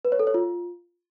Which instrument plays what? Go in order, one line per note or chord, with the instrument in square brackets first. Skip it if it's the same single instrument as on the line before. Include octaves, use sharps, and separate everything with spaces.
[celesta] B4
C#5
A4
C#5
F4